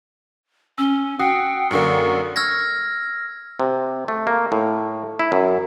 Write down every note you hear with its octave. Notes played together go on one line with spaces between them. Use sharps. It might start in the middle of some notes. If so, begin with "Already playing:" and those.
C#4 E6 G7
F#4 G5 D#6 C7 C#7
F#2 D3 A#3 C#6
E6 F6 G#6 A#6
C3
A3
A#3
A2
E4
F#2